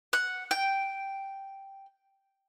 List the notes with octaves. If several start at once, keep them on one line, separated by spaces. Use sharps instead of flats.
F#5
G5